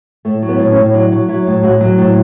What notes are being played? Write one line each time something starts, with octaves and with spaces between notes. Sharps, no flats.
A2 A3
F#3
B3
A2
C#4
A2
F#3 D4
F#3
F#3 E4
A2
A2 F#4
F#3
A2